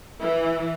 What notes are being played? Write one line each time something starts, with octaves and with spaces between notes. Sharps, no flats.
E3